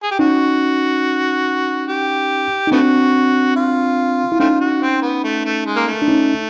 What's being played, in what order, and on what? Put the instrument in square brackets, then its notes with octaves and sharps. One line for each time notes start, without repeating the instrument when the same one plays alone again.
[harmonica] G#4
G4
[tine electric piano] C#4 D#4 [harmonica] F#4
[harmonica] G4
[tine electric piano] D#4
[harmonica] A3 B3 F#4 [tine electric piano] C4 D4
[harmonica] F4
[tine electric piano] E4
[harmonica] A3 C4 F4 [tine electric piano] C#4 D#4
[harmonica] F#4
C4
B3
A3
A3
G#3
A#3
A3
[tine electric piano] D4
C#4 D#4